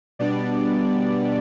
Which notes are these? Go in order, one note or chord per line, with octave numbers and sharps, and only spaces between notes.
B2 G3 B3 D4 D5